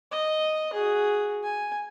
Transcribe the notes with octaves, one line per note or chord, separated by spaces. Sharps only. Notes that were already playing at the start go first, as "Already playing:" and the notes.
D#5
F#4 G#4
G#5